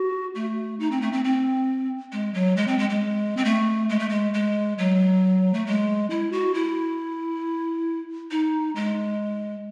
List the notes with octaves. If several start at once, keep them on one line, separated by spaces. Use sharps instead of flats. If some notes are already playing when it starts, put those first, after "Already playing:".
Already playing: F#4
A3
D#4
C4
A3
C4
C4
G#3
F#3
G#3
C4
G#3
G#3
C4
A3
G#3
A3
G#3
G#3
F#3
A3
G#3
E4
F#4
E4
D#4
G#3